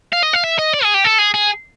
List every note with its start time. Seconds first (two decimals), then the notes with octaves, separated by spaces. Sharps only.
0.13 F5
0.23 D#5
0.34 F5
0.44 E5
0.59 D#5
0.74 D5
0.84 G#4
0.94 G4
1.04 A4
1.18 G#4
1.34 G#4